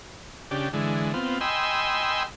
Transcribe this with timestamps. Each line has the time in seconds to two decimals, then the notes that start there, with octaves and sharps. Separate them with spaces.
0.51 C#3 D4 G4
0.73 D3 E3 G#3
1.14 B3 C4 F4
1.41 D#5 G5 G#5 B5 C6 E6